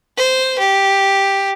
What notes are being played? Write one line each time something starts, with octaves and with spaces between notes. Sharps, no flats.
C5
G4